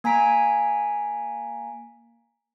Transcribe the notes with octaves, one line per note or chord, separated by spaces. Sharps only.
A#3 G#5 A#5 B6 D7